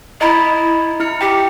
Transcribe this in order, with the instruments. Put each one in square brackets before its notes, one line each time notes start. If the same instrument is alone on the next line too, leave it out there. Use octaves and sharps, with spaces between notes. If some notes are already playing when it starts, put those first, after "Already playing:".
[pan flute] E4 [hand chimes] D#5 A#5 B5
[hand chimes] E4 F6 C#7
[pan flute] G4 [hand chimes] G5